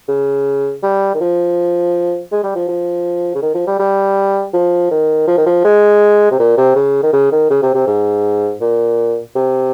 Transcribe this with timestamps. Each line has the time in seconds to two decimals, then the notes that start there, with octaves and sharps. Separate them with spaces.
0.08 C#3
0.83 G3
1.15 D#3
1.20 F3
2.32 G#3
2.44 G3
2.56 F3
2.68 F3
3.35 C#3
3.42 D#3
3.55 F3
3.67 G3
3.79 G3
4.54 F3
4.91 D#3
5.28 F3
5.37 D#3
5.46 F3
5.65 G#3
6.31 C3
6.39 A#2
6.58 C3
6.75 C#3
7.03 D#3
7.13 C#3
7.32 D#3
7.50 C#3
7.62 C3
7.74 C3
7.87 G#2
8.61 A#2
9.36 C3